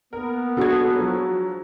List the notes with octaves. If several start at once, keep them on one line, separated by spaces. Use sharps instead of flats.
A#3 B3 A#4
D4 F#4 G#4 A4 G#6
F3 F#3